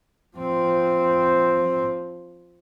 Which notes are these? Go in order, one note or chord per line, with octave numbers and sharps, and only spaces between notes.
F3 C4